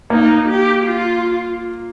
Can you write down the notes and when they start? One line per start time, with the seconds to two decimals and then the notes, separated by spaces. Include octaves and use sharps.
0.10 A#3 D#4
0.48 G4
0.85 F4